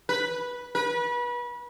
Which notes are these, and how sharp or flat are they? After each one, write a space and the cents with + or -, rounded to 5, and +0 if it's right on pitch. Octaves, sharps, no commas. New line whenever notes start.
B4 -10
B4 -30